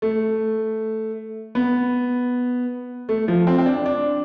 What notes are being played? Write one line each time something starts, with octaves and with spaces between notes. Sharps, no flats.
A3
B3
A3
F3
C4
C4
D4
D4